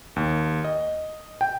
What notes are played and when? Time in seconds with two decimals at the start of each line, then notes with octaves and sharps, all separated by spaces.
0.16 D#2
0.64 D#5
1.41 G5